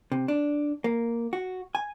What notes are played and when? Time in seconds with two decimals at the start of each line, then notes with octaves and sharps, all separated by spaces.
0.12 C3
0.28 D4
0.84 A#3
1.33 F#4
1.75 G#5